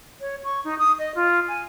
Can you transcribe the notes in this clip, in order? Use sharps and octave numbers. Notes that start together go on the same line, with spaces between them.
C#5
C#6
D#4
D#6
D#5
F4
G#5